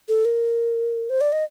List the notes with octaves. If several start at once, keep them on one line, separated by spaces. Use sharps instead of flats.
A4
A#4
C5
D5
D#5